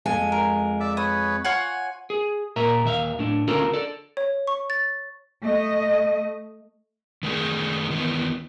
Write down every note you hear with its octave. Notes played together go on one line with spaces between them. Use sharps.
F2 G#3 G#5
A#4
D5 E5
B4 C#5 D#6
F4 C#5 F#5 G#5
G#4
A#2 A#4 E5 A#5
D#2 E5 F5
A2 D4
D2 C#3 F4 F#4 A4 A#4
A4 D5
C#5
C#6
A6
A3 D#5
D#3 A3 D#4 G#4
D#3 E3 B3